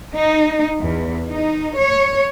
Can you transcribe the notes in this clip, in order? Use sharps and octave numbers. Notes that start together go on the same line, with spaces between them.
D#4
E2
D#4
C#5